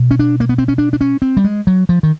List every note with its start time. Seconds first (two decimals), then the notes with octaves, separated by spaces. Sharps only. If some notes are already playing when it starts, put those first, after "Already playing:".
Already playing: B2
0.11 C#4
0.19 D4
0.40 A#3
0.49 B3
0.58 C4
0.68 C#4
0.78 D4
0.93 D4
1.01 C#4
1.22 C4
1.37 G3
1.44 G#3
1.67 F#3
1.89 F3
2.03 D#3